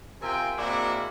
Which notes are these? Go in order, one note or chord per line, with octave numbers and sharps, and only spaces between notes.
C3 F4 A#4 E5 G5 G#5
G#3 A#3 C4 D4 E4 F#4